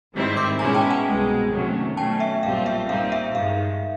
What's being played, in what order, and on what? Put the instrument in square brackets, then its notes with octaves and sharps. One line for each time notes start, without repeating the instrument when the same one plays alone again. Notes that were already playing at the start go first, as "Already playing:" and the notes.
[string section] G#2 D#3 G3 C4 E4
[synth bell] C6 D6
[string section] B2 G#3 C#4 E4 [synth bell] G#5 A#5
[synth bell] G5 A5
F#5 G#5
[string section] C2 B2 G#3
C3 D#3 F#3 A3 C#4
[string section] B2 F#3 A3 C#4 [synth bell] G5 A5
[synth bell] E5
[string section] B1 A#2 G3 C4 F4 [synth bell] F5
[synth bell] E5
[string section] A#2 G3 C4 D#4 [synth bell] F5
[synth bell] E5
[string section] G2 D#3 G#3 [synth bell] F5